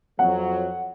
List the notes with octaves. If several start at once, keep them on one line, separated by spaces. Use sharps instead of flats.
F2 F#3 F#5